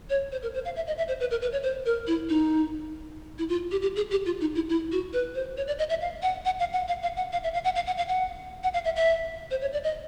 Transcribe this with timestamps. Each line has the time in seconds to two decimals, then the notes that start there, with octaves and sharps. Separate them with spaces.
0.10 C#5
0.32 C5
0.43 A#4
0.54 C5
0.65 F5
0.76 E5
0.87 D#5
0.98 E5
1.08 C5
1.20 B4
1.31 A#4
1.42 B4
1.52 C#5
1.63 C5
1.86 A#4
2.07 E4
2.29 D#4
3.39 E4
3.49 F4
3.71 G4
3.82 G4
3.96 G#4
4.11 G4
4.26 F4
4.41 D#4
4.55 E4
4.70 E4
4.92 F#4
5.13 B4
5.35 C5
5.57 C#5
5.67 D5
5.79 D#5
5.90 E5
6.01 F5
6.22 F#5
6.45 F#5
6.60 F5
6.73 F#5
6.88 F5
7.03 F5
7.17 F#5
7.33 F5
7.44 E5
7.54 F5
7.65 F#5
7.75 F5
7.87 F#5
7.98 F5
8.08 F#5
8.64 F#5
8.74 F5
8.85 E5
8.96 E5
9.51 C5
9.61 C#5
9.73 D5
9.84 D#5